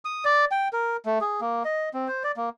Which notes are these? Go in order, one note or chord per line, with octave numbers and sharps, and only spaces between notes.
D#6
D5
G5
A#4
A3
G#4
A#3
D#5
C4
C5
D5
A#3